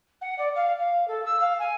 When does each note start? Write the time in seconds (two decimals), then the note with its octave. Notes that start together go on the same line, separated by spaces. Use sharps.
0.21 F#5
0.38 D5
0.55 F5
0.79 F5
1.08 A4
1.25 E6
1.40 F5
1.59 G#5